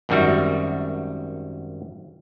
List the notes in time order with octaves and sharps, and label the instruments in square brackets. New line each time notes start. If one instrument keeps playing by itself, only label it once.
[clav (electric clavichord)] G#1 F#2 D#3 G3 F#4 E5